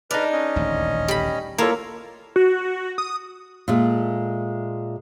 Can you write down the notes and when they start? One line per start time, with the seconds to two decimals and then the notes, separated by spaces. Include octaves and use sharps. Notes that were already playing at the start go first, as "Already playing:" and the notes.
0.11 G#3 D4 D#4 B4 D5 F6
0.32 C#4 D#5
0.56 D#1 A1 D2
1.08 G3 B5
1.58 A#3 E4 F4 A4 C#5 A#5
2.36 F#4
2.98 D#6
3.68 A#2 G#3 A3